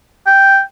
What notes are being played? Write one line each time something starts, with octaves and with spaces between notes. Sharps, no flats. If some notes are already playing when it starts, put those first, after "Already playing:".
G5